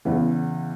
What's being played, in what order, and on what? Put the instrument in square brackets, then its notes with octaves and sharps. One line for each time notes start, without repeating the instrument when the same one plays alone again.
[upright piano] E2 C#3 E3 B3